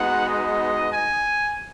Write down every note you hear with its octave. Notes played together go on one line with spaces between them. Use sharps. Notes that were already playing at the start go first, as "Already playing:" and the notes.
Already playing: G#3 B3 D#4 F#4 F#5
D#5
G#5